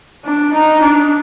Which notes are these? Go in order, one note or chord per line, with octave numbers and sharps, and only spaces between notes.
D4
D#4
D4